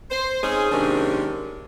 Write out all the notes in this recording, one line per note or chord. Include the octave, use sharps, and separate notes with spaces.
C5
C4 C#4 D#4 G#4
G#2 C3 D#3 A#3 C#4 D4